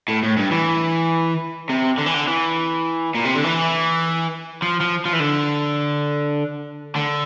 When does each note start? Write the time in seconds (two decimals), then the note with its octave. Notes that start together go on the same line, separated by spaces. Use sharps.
0.08 A2
0.23 A2
0.37 G2
0.51 E3
1.69 C3
1.98 D3
2.06 E3
2.14 D3
2.27 E3
3.15 A#2
3.25 C3
3.35 D3
3.44 E3
4.62 F3
4.81 F3
5.05 F3
5.13 E3
5.20 D3
6.96 D3